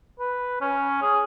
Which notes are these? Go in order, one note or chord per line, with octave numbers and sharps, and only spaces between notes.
B4
C#4
G#4